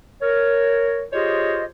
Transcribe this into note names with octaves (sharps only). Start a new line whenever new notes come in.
A#4 C#5
F4 G4 G#4 C5 C#5 D#5